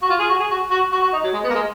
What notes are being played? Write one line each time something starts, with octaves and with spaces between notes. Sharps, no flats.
F#4
F4
G#4
F#4
G#4
F#4
F#4
F#4
F#4
D#4
F#3
G#3
B3
A#3
G#3